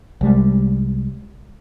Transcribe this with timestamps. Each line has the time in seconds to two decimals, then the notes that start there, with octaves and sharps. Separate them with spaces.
0.21 C2 G3 G#3